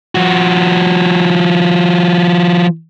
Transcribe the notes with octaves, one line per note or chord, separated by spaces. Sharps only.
F3 F#4